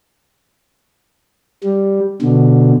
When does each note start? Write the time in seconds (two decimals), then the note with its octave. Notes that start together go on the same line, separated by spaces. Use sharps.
1.63 G3
2.22 B2 D3